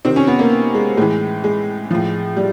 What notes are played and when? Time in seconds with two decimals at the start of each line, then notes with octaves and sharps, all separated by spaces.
0.05 C3 D#3 C4
0.16 C#4
0.27 B3
0.39 A#3
0.75 G#3
0.97 A2 E3 G#3
1.44 G#3
1.91 A2 F3
2.37 G3